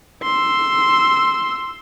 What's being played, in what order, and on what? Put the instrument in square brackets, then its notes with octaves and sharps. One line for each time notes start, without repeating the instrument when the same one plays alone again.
[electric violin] C6 E6